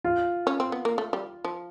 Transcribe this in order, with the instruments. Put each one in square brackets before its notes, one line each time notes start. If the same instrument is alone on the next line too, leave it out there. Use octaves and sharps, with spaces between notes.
[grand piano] F4
[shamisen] C#4
C4
B3
A#3
A3
G3
F3